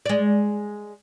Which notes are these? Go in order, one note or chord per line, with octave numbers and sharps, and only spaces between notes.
G#3 D5